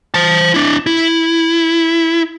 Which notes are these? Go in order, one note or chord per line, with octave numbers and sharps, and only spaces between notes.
C5 A5
D4 E4
E4